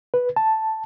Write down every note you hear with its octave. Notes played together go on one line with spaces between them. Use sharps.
B4
A5